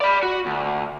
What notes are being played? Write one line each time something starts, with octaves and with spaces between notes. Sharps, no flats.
D5 B5
F#4
D2